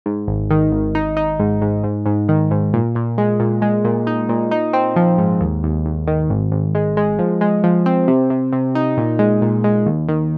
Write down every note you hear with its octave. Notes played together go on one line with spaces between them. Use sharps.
G#2
G#1
D#3
G#1
D#4
D#4
G#2
G#2
G#2
G#2
D#3
G#2
A#2
A#2
G#3
A#2
G#3
A#2
D#4
A#2
D#4
C4
F3
G#2
D#2
D#2
D#2
D#3
G#1
G#1
G#3
G#3
F3
G#3
F3
C4
C3
C3
C3
D#4
A#2
G#3
A#2
G#3
D#2
D#3